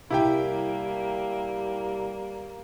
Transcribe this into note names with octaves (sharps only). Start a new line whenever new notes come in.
C2 G3 A#3 E4 G4 A#4 G5